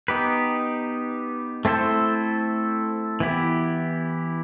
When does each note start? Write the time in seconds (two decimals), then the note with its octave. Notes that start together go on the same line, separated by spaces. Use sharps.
0.08 B3 D#4 G4 B4
1.65 A3 C4 E4 A4 C5
3.20 E3 B3 E4 G4